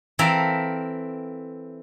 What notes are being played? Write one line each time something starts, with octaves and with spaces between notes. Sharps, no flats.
E3 C4 A4 A#4 E5 F5